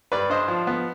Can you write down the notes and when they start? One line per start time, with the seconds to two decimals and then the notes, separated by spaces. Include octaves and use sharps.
0.12 G2 B4 D5
0.30 D4 C5 D#5
0.48 F3
0.67 B3